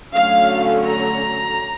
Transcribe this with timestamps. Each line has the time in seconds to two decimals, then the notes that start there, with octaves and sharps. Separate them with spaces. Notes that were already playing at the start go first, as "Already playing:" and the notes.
0.14 D3 F#3 A3 C#4 F5
0.85 A#5